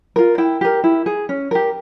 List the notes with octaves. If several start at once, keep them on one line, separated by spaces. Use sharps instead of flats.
F4 A#4
E4 G5
G4 A#4
E4
G#4
C#4
G4 A#4